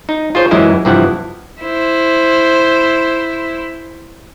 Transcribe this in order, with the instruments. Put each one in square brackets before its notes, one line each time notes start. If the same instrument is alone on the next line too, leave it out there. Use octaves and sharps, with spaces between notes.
[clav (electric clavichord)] D#4
F4 G#4 C5 C#5
F#2 E3 G#3 C#4 E4 D#5
G2 C3 E3 F3 E4 F#5
[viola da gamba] E4 C5